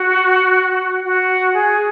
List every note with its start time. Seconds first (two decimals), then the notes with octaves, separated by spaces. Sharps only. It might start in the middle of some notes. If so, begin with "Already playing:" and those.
Already playing: F#4
1.04 F#4
1.54 G#4